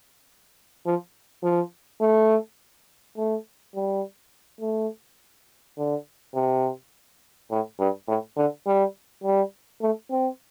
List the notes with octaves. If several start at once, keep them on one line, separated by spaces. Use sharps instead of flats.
F3
F3
A3
A3
G3
A3
D3
C3
A2
G2
A2
D3
G3
G3
A3
C4